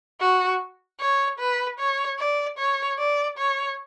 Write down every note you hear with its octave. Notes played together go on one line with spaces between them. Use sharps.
F#4
C#5
B4
C#5
D5
C#5
D5
C#5